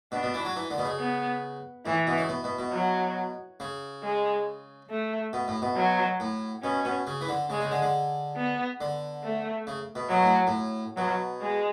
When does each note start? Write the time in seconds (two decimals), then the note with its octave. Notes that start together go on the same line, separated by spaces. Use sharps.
0.12 B2 D4
0.23 B2
0.34 E3
0.45 F#3
0.56 E3
0.71 D3
0.78 B2
0.85 C#3
0.99 B3
1.86 A2 E3
2.07 B2
2.18 C#3
2.29 B2
2.44 B2
2.59 B2
2.73 F#3
3.60 C#3
4.04 G#3
4.90 A3
5.33 B2
5.48 A2
5.62 B2
5.76 F#3
6.20 A2
6.63 B2 C#4
6.85 B2
7.07 C#3
7.21 E3
7.29 D3
7.50 C#3 G#3
7.61 C#3
7.72 D3
7.82 D3
8.36 B3
8.81 D3
9.24 A3
9.67 C#3
9.95 B2
10.10 B2 F#3
10.23 A2
10.47 A2
10.97 B2 F#3
11.41 G#3